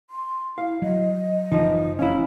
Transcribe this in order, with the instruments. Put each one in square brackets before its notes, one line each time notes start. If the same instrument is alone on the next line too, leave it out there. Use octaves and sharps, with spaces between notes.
[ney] C6
[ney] E4 [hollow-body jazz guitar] F5
[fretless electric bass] F#3 [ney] D#5
[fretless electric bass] F#1 C#3 E3 [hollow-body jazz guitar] F3 D#4
[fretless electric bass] F1 [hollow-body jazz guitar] C#4 E4 [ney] F5